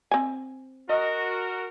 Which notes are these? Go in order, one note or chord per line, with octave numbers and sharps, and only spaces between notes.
C4 G#5
F#4 A#4 D#5